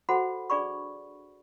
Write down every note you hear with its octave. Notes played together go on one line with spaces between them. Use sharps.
F#4 A4 C5 F#5 B5
D4 G#4 D5 B5 C#6